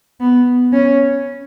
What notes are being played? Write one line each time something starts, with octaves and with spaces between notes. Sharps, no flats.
B3
C#4